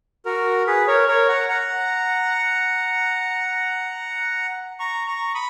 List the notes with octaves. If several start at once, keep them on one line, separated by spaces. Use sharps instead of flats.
F#4 A#4
G#4 B4
A#4 C#5
A#4 C#5
F#5 A#5
F#5 A#5
A#5 C#6
A#5 C#6
B5 D#6